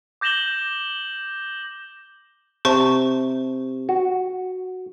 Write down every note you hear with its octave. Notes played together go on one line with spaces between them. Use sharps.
D6 G6 A#6 E7 F#7 G7
C3 C5 A5 C#6
F#4